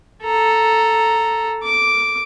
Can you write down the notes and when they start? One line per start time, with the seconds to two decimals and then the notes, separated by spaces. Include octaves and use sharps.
0.23 A4 A#5
1.63 D6